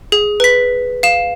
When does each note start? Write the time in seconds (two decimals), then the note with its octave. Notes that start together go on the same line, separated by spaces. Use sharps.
0.12 G#4
0.40 B4 B6
1.03 F5 E7